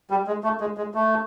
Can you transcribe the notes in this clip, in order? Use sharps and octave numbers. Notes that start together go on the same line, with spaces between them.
G3
G#3
A3
G#3
G#3
A3